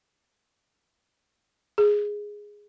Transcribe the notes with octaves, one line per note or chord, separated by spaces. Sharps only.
G#4